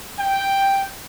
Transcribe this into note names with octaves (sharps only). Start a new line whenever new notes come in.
G5